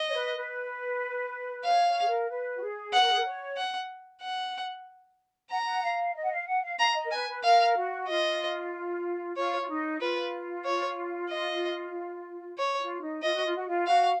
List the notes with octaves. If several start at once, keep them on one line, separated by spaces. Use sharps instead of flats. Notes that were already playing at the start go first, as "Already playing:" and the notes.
Already playing: D#5
C#5
B4
B4
C#5 F5
C#5
G#4
A#4
B4
F#4
G#4
B4 F#5
A#4
G#4
A#4
C#5
F#5
F#5
F#5 A#5
F#5
F5
D#5
F#5
F5
F#5
F5
F5 A#5
F5
D#5
A#4
B4 G#5
B4
A#4 F5
F#4
F4 D#5
F4 C#5
F4
D#4
F4 B4
C#5
D#5
C#5
F4
D#4
F4 D#5
F#4
F4
F#4
F4
F#4 F5